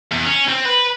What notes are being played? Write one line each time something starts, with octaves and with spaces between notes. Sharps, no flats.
E2
C#4
C4
B4